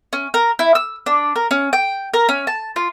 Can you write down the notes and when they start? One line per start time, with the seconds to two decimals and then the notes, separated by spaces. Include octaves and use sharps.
0.13 C#4
0.34 A#4
0.59 E4
0.75 E6
1.06 D4
1.36 A#4
1.51 C#4
1.73 G5
2.14 A#4
2.29 C#4
2.47 A5
2.76 F4